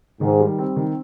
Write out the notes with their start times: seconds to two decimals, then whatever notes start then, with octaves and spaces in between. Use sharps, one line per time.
0.21 G#2 D#3
0.40 G3
0.59 C4
0.76 D#3